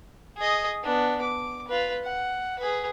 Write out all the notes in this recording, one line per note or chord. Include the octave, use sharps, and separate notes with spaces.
G#4 D#5
B3 D4
D6
F4 B4
F#5
G#4 B4